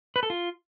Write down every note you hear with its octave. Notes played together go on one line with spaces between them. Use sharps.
B4
A4
F4